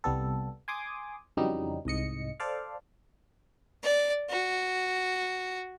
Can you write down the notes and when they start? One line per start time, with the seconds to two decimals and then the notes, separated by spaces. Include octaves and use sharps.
0.04 C2 G3 B3 A4
0.68 G#5 C6 D6 D#6
1.37 F2 C#3 E3 F#3 G3 D#4
1.85 C2 G#2 D#5 C#7
2.40 A4 C5 D5 F5
3.83 D5
4.30 F#4